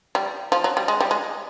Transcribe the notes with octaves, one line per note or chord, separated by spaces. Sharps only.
G3
F3
F#3
G3
G#3
G3
G#3